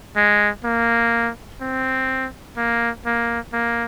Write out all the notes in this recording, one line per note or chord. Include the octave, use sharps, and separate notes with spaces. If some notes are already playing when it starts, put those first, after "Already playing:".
G#3
A#3
C4
A#3
A#3
A#3